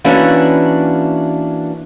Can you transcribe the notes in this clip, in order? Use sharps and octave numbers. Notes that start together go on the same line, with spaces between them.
E3 A#3 C#4 D4 F#4 E5